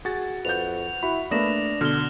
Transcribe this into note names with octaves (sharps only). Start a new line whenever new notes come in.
F#4 G#4 A6
F2 B4 F#5 G6 F7
E4 F#4 B5
A3 A#3 D4 B4 D#6 A#6 E7
B2 D3 F6 G7